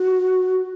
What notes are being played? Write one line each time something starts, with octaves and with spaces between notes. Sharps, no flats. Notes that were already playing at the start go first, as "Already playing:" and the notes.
Already playing: F#4